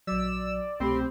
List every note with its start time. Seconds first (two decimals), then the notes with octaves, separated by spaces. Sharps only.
0.07 A#1 F#3 D5 E6
0.80 C2 B2 A3 C4 G4 B5 C6